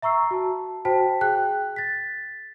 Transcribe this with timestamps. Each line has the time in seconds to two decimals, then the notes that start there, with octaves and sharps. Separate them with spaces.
0.02 E5 A#5 C#6 E6 C7
0.31 F#4 A5
0.85 F#4 C5 G5 A5 B6
1.21 G#4 G5 F#6
1.76 A6 B6